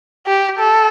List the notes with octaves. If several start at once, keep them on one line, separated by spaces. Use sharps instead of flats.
G4
A4